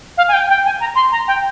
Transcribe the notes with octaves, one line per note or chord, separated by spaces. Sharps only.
F5
G#5
G5
G5
G#5
A#5
C6
A#5
G5